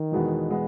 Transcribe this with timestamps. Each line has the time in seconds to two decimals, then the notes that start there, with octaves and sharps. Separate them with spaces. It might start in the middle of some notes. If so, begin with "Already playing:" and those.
Already playing: D#3
0.12 E2 B2 G#3 B3
0.49 B2 G#3 B3